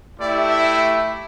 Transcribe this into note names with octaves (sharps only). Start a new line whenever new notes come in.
A3 E4 G4 D5
E5